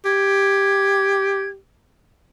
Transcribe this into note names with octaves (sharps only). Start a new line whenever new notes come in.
G4 G#6